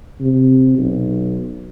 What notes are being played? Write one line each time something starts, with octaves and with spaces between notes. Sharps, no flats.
C3
B1